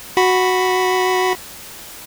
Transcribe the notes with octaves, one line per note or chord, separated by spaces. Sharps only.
F#4 B5